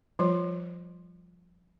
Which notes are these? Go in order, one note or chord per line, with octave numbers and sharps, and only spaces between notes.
F3 G3 F4 C#5